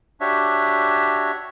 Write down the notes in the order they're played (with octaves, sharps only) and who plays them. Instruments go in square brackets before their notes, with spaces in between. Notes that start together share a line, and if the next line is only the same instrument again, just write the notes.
[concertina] D4 F#4 G4 C#5 E5